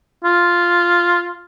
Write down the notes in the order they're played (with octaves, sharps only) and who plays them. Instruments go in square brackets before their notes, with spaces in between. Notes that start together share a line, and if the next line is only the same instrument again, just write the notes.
[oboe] F4